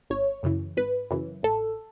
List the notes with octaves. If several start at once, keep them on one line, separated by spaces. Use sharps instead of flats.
G#1 C#5
F#2 C#3 E3
G#1 B4
F#2 C#3 E3
A1 A4